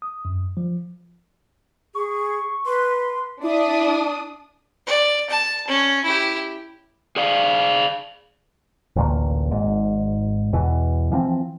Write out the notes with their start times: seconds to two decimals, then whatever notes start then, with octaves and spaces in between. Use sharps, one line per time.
0.02 D#6
0.25 F#2
0.57 F3
1.95 G#4 C#6
2.66 B4 C6
3.43 D4 E4 E5 D#6
4.87 D5
5.30 A5
5.68 C#4
6.04 E4 G4
7.16 G#4 D5 F5
8.96 A1 D2 A#2 A#3
9.51 G#1 G#2
10.53 E2 B2 E3
11.12 E3 F3 A#3 C4